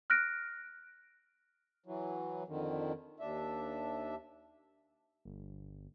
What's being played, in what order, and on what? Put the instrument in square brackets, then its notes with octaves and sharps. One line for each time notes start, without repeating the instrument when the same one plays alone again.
[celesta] F6 F#6 A#6 D7
[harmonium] E3 F#3
F2 D3 D#3
D#2 D4 E5
[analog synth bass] G1